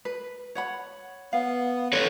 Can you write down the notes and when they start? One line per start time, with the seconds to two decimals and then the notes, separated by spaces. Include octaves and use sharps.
0.05 B4
0.55 C#5 F#5 B5
1.33 B3 F5
1.93 A4 B4 C#5